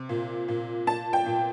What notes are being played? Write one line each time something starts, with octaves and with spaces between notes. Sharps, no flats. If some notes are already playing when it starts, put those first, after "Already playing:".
Already playing: C3
A#2
A#2
A#2 A5
G5
A#2